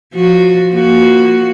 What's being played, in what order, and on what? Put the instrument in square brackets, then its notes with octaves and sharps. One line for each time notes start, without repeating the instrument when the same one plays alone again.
[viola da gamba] F3 F#4
F3 A#3 F#4